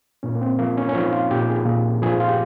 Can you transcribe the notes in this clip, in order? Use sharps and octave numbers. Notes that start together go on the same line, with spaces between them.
A#2 C#4
A#3
C4
F3 A#3
C#4
C#4
F3 D#4
F4
A#2 G4
G#4
A#2
F3 G#4
F4
G4